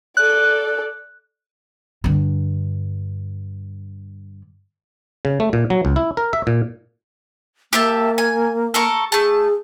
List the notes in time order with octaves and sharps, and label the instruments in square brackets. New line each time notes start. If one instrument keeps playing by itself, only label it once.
[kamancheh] A4 D5 [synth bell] F#6
[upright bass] G2 D3
[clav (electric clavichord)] C#3
A3
A#2
F#3
C#2
E4
A#4
E5
A#2
[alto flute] A#3 [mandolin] G4 E5 A5
[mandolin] G#5
A4 A#4 C#6
[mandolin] A3 A5 [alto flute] G#4